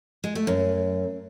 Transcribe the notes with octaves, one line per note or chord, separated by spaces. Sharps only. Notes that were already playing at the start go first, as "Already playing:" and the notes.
G#3
A3
F#2